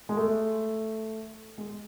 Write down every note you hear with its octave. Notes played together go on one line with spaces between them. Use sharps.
G#3
A3
G#3